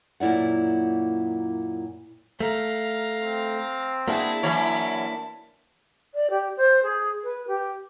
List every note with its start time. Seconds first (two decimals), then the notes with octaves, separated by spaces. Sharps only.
0.20 F#2 A#2 E4 D5 F#5
2.41 A3 F5 A#5
3.20 C4
4.08 A#3 D4 E4 F#4 G#4 A5 B5
4.43 E3 F#3 C#5
6.14 D5
6.30 G4
6.57 C5
6.83 G#4
7.24 B4
7.47 G4